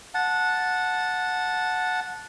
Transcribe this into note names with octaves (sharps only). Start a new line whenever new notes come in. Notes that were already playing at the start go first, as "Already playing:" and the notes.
F#5 A5